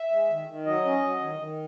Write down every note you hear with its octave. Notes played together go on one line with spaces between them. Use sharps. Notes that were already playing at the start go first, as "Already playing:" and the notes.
Already playing: E5
G#3
D#3
D#3
F#3 D#5
C#4
F#3
D#3
D#3